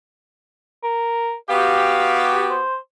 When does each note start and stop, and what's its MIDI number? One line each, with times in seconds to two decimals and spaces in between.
0.83 1.35 70
1.50 2.62 59
1.50 2.62 66
1.50 2.62 67
1.50 2.38 77
2.50 2.77 72